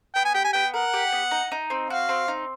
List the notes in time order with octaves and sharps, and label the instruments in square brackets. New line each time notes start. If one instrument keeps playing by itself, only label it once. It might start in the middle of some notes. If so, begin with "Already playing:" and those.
[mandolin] B3 [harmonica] G5
[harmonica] G#5
[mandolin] G4 [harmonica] G5
[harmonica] G#5
[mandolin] B3 [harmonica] G5
[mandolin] A#4 [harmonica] F#5
[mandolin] G4
B3
D#4
D#4
C4
[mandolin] F#4 [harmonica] F5
[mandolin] C4
D#4